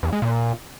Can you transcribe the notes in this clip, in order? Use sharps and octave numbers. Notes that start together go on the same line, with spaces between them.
E2
G#3
A#2